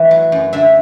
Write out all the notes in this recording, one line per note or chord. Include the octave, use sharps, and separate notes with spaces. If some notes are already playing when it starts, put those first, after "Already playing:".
Already playing: E3 A3 B4
F#3
F#2
D3 E5